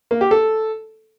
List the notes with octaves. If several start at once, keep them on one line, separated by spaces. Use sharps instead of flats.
A#3
G4
A4